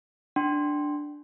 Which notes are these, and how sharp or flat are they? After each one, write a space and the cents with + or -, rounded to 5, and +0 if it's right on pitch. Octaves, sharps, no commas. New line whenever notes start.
D4 +5 G5 -25 C6 +0